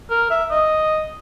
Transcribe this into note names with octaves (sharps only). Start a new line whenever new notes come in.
A#4
E5
D#5